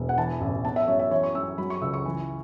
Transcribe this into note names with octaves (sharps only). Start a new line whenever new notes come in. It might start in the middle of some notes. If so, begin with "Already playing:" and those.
Already playing: E1
F#5
E3 A5
A1
B3 A5
E5
F#2 C#5
E5
E3 C#5
C#6
F#2 E6
F#3 B5
C#6
C#2 E6
C#6
E3